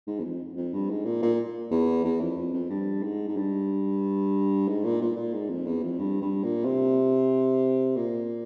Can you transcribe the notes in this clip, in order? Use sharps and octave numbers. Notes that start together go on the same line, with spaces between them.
G#2
E2
F2
F2
G2
G#2
A#2
A#2
E2
E2
F2
F2
F2
G2
G#2
G#2
G2
G#2
A#2
A#2
A#2
G#2
F2
E2
F2
G2
G2
A#2
C3
A#2